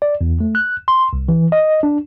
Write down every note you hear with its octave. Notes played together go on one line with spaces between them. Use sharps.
D5
E2
A3
F#6
C6
C2
E3
D#5
D4